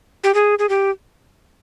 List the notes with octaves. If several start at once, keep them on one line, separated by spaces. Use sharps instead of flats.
G4
G#4
G#4
G4